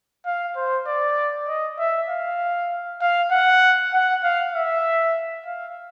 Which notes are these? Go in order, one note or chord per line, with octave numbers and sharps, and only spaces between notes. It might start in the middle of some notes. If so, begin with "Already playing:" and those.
F5
C5
D5
D#5
E5
F5
F5
F#5
F#5
F5
E5
F5